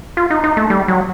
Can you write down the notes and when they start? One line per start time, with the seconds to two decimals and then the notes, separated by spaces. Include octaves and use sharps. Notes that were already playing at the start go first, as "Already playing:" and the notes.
0.17 F4
0.30 D#4
0.44 D#4
0.57 A3
0.70 G3
0.88 F#3